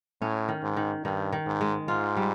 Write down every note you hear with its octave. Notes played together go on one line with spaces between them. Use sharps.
A2 C#4
D#3
G#2
D#3
G2 D#3
D#3
G#2
G#3
G#2 F4
G3